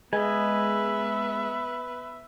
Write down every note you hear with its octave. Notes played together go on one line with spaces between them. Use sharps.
G#3 B3 B4 D#5 E5 G#5